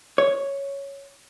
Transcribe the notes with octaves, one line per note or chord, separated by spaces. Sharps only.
C#5